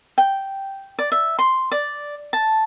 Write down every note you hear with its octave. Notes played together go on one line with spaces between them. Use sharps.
G5
D5
E5
C6
D5
A5